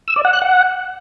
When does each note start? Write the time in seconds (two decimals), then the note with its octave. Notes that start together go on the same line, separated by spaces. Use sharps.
0.08 E6
0.16 D5
0.25 F#5
0.33 F#6
0.42 F#5